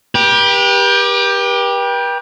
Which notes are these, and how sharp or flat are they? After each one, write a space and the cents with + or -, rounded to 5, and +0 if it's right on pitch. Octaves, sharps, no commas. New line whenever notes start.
G4 +15 B4 -40